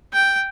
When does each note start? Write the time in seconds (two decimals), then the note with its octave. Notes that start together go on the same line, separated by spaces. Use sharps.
0.13 G5